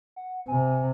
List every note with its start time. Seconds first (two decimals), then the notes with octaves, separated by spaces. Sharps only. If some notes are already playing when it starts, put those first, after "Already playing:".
0.16 F#5
0.48 C3 G#5